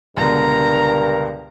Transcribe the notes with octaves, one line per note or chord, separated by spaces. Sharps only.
C#2 G2 B2 D3 A#4 A#5